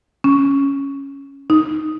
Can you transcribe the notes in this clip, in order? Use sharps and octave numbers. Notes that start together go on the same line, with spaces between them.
C#4
D#4